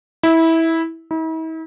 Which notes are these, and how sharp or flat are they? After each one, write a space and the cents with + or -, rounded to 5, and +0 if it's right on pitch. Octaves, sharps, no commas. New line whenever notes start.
E4 -15
E4 -45